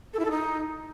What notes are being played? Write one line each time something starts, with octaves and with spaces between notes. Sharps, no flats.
A4
E4
A4
D#4